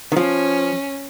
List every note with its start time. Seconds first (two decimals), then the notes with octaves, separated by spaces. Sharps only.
0.12 D#3
0.16 F3 C#4